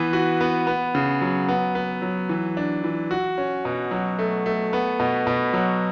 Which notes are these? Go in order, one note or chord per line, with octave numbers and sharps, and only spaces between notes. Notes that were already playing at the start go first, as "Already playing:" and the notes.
Already playing: E3 B3
F#4
B3
B3
C#3
F#3
B3
B3
F#3
E3
D4
E3
F#4
C#4
B2
F#3
A3
A3
B3
B2
B2
F#3